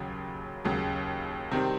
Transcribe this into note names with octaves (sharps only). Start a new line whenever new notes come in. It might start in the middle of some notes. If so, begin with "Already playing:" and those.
Already playing: D#2 C#3 F#3
D#2 C#3 F#3
C3 D#3 G3 C4